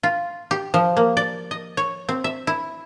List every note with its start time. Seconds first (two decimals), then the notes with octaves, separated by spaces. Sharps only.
0.03 F4
0.51 G4
0.74 F3
0.97 A#3
1.17 D5
1.51 D#5
1.77 C#5
2.09 C4
2.24 E5
2.47 E4